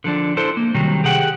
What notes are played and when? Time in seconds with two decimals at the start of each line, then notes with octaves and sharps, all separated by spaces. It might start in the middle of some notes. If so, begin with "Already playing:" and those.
0.04 D3 F3 D4
0.37 D4 E4 A4 C5
0.57 A#3
0.75 C3 D#3 F#3 G3
1.04 G4 G#4 F#5 G5